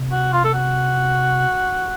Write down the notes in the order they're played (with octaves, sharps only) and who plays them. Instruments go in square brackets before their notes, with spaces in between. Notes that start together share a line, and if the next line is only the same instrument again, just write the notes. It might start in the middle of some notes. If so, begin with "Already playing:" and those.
Already playing: [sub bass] C3
[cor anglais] F#4
F4
A4
F#4